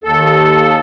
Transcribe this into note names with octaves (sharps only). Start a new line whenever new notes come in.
D#2 A4